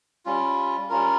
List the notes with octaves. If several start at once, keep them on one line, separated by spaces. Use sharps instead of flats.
G3 C#4 F4
G3 C#4 F4 A#4